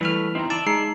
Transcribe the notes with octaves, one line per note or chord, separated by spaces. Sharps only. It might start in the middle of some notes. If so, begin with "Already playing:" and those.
E3 G3 A3 B5 F6
E2 C4 D#4 E4 A#5
D5 E5 A5
G#3 D#4 C7